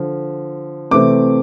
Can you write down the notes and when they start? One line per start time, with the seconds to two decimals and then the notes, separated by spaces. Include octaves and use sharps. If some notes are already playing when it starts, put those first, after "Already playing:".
Already playing: D3 F3
0.91 C3 E3 A3 C4 D6